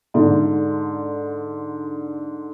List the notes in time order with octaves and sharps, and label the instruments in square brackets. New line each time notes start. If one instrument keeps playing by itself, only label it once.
[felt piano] G#2 D3